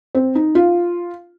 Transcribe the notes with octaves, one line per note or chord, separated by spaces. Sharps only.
C4
D#4
F4